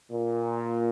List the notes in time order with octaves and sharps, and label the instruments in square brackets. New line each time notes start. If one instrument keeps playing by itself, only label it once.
[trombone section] A#2